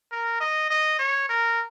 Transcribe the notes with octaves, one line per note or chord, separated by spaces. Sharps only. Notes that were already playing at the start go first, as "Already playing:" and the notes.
A#4
D#5
D#5
C#5
A#4